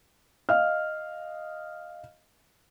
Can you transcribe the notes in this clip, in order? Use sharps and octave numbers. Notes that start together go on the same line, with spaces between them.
D#5 F5 F6